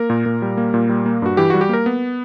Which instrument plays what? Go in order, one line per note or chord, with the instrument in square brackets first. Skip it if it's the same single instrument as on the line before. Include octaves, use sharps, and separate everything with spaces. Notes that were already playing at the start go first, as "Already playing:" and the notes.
Already playing: [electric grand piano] A#3 A#4
A#2
A#2
G3
A#3
A#2
G3
A#3
G2 F#4
E3 G4
G3 F#4
G4
A#3 A#4
B3